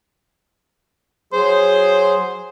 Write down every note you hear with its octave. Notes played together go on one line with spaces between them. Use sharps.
F#3 G#4 C5